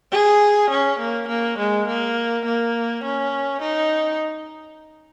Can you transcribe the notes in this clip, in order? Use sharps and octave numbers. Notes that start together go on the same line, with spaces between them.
G#4
C#4
A#3
A#3
G#3
A#3
A#3
C#4
D#4